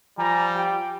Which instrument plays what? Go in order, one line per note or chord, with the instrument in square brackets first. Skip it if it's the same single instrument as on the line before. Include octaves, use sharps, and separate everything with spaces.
[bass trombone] F3 [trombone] G3 [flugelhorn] G#5 [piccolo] A#5
[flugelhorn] G4 [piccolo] G5